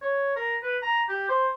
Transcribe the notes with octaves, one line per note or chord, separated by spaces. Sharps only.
C#5
A#4
B4
A#5
G4
C5